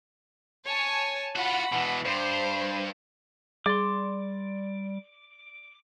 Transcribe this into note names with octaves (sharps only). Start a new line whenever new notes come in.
C#5 G#5 A5
F4 F#4 F#5 B5
B2 E3
G2 C5
G3 G#4 D5 C6 D6